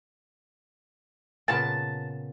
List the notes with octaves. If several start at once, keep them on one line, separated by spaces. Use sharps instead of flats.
A#2 C#3 B3 A5